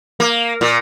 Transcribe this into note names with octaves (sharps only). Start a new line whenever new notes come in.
A#3
A#2